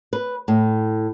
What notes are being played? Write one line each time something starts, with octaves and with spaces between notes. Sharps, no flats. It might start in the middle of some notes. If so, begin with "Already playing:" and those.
B4
A2